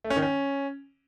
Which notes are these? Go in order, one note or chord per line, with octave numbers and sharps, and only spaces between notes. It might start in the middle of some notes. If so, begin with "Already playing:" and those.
A3
C#4
D#3
C#4